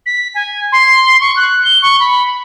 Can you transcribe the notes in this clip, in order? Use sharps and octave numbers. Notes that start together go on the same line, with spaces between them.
B6
G#5
C6
C#6
F#6
G7
C#6
B5